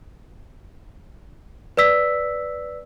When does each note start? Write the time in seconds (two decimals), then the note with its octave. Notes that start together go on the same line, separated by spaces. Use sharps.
1.77 B4 D5 E6 B6